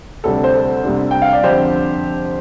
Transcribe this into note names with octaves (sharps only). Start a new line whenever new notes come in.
D2 C3 G3 D4 A4
C5
A4
C2 C3 G3 D4
G5
F5
D5
F2 D3 G3 C4 G4 C5